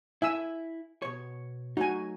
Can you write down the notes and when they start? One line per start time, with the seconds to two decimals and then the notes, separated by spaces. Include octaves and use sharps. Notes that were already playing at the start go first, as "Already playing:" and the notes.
0.22 E4 E5 G#5 E6
1.02 B2 C#5
1.77 F#3 A3 D#4 F#4 G#5